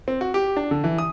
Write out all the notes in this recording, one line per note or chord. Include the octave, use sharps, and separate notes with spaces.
C4
F#4
G4
D4
D3
E3
D#6